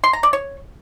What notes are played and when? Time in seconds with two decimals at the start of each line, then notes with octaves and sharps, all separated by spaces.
0.04 C6
0.13 A#5
0.23 D5
0.33 C#5